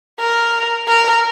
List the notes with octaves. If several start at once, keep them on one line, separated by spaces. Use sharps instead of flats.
A#4
A#4